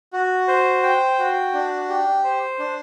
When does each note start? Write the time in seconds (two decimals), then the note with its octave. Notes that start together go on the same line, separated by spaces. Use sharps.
0.13 F#4
0.48 C5
0.83 G5
1.19 F#4
1.54 D4
1.89 G4
2.24 C5
2.59 D4